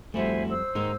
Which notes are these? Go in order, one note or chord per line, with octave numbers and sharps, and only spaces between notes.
F2 G3 A3 E4 F#4 C5 E5 G#5
C5 E6
G#2 G#3 A#3 D#4 A#4